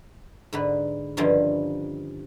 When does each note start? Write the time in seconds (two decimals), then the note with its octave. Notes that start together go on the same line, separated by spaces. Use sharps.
0.53 G#2 D3 B4
1.17 G2 D3 D#3 F3 C#4